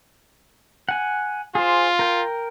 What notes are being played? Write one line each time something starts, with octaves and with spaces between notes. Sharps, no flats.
F#5 G#5
F4 G#4 C5
A#4 G5